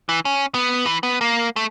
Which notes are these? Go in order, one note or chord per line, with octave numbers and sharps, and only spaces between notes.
E3
C#4
B3
E3
B3
A#3
A3